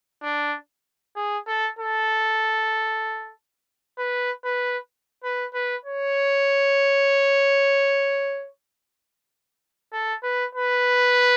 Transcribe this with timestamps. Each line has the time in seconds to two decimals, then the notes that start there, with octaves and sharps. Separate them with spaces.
0.22 D4
1.16 G#4
1.47 A4
1.79 A4
3.98 B4
4.44 B4
5.23 B4
5.54 B4
5.85 C#5
9.92 A4
10.23 B4
10.55 B4